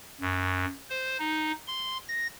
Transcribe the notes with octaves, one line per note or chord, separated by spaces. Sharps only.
F#2
C5
D#4
C6
A#6